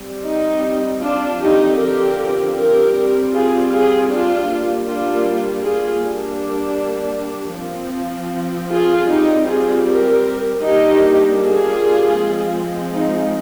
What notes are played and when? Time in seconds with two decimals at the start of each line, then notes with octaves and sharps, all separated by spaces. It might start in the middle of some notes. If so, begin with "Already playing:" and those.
Already playing: G3 C4
0.25 D#4
1.01 D4 F4
1.40 D3 F3 C4 D#4 G4
1.78 G4 A#4
2.56 G4 A#4
2.94 G3 C4
3.32 F4 G#4
3.71 F4 G#4
4.09 D4 F4
4.48 G3 A#3 D4
4.87 D4 F4
5.63 F4 G#4
6.02 G3 A#3 D4
7.57 F3 C4
8.71 F4 G#4
9.10 G3 C4 D#4 G4
9.48 F4 G#4
9.87 G4 A#4
10.64 G3 A#3 D4 D#4 G4
11.41 F4 G#4
12.17 F3 G#3 C4
12.95 D#4